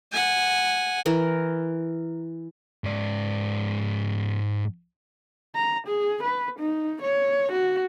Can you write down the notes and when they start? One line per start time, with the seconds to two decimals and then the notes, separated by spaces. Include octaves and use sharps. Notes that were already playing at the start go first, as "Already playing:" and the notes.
0.12 F#5 G#5
1.06 E3 A#4
2.84 G#2 D5
5.55 A#5
5.87 G#4
6.23 B4
6.59 D#4
7.02 C#5
7.52 F#4